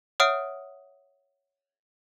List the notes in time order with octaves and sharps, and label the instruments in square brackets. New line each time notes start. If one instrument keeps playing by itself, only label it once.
[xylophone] C#5 E5 F#5 D#6 F6 D7